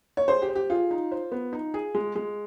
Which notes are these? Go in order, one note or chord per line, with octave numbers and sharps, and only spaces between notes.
C#5
G#4 C5
G4
C5
G4
F4 G#4
D#4
C5
B3
D#4
G#4
G#3
G#3